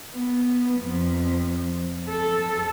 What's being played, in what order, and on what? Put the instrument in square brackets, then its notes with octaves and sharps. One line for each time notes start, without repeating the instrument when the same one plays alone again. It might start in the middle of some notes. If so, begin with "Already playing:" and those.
[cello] B3
F2
A4